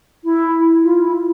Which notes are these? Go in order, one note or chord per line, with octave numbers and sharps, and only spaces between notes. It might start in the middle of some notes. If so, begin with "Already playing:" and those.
E4
F4
E4
E4